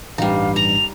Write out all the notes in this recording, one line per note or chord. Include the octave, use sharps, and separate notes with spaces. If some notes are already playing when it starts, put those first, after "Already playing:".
A1 G2 G3 D#4 F5
A#5 F7